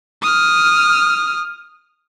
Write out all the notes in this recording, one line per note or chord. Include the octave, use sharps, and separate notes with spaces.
D#6 F6